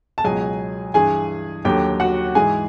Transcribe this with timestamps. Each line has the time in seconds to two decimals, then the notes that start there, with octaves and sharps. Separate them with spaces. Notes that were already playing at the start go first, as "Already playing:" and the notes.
0.18 A5
0.24 C#2 B2 F#3 G#4 G#5
0.94 G2 E3 G#4 G#5
1.65 D#2 D3 F#3 G4 G5
2.00 F#4 F#5
2.35 G#2 E3 G#4 G#5